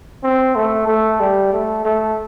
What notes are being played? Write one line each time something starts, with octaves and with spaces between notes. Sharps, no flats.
C4
A3
A3
G3
A3
A3